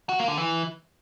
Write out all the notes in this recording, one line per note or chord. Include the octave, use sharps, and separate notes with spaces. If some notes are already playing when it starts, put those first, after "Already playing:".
F#4
A#3
D3
E3